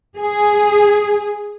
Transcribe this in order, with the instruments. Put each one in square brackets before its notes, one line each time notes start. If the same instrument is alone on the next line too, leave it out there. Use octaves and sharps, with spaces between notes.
[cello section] G#4